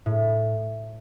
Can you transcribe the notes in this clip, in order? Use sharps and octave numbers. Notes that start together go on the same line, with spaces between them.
A2